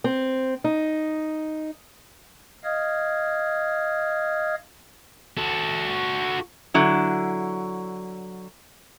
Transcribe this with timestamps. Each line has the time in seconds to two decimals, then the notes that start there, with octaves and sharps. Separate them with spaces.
0.04 C4
0.64 D#4
2.64 D#5 F5 D#6 F6 G#6
5.38 F#4 A4
6.74 D3 F#3 E4